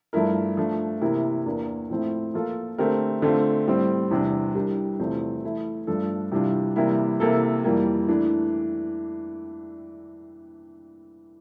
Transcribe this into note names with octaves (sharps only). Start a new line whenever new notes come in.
G2 F3 A3 E4 A#4
F3 A3 D4
C3 E3 A#3 E4 A#4
E2 E3 A#3 D4
A2 F3 A3 C4 E4
F3 A#3 F4 A4
D3 A3 C4 G4 A#4
D3 A3 C4 F4
A2 G3 C4
E2 C3 G3 D4
E3 G3 D4 G4 A#4
E2 C3 F3 A3 C4
E3 A3 E4
G2 F3 A3 D4 A4
C3 E3 G3 D4 F4
C3 E3 G3 A#3 E4
C3 E3 A#3 E4 A4
F2 E3 G3 A#3
E3 A3 D4